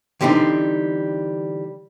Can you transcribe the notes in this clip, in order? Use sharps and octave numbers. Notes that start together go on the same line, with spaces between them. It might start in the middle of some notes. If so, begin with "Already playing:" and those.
D3 E3 G3 C4 D#4